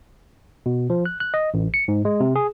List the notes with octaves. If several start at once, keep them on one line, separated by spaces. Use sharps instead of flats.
B2
F3
F#6
F#6
D#5
A1
C#7
G#2
G#3
C3
G#4